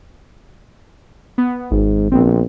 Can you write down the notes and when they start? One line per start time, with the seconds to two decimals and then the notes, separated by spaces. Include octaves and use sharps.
1.38 B3
1.71 G#1 G#2
2.12 A#1 B3 C4